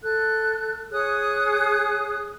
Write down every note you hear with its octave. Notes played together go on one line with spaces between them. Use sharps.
A4 F#6
G#4 C#5 D#6 F#6